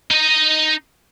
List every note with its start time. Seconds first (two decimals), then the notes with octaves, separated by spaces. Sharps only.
0.11 D#4 D#5